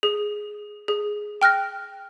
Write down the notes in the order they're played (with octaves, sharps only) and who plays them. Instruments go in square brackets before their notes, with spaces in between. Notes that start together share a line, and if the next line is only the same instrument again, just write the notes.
[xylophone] G#4
G#4
G5 F6 F#6 A#6